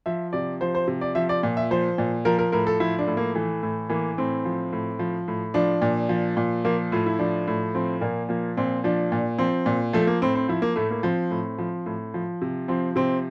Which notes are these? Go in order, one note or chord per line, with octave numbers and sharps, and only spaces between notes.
F3 E5
C3 D5
F3 C5
C5
C3
D5
F3 E5
D5
A#2
E5
F3 C5
A#2
F3 A#4
A#4
A2 A#4
A4
F3 E4
D4
A2
A#3
E3 A3
A2
E3 A#3
A2 C4
F3
A2
F3
A2
F3 D4
A#2
F3
A#2
F3 A#3
A2 F4
E4
F3 D4
A2
F3 C4
A#2 A#3
F3 A#3
A#2 C4
F3 D4
A#2
F3 C4
A#2
F3 A3
A#3
A2 C4
C4
F3 E4
A#3
A2 A3
A#3
F3 C4
A2
F3
A2
F3
C3
F3 C4
C3 C4